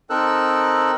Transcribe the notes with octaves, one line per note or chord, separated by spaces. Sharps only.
C4 D#4 A4 A#4 E6 F#6